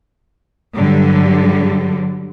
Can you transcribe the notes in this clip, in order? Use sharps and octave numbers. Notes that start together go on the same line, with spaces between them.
G2 D3 F#3 G3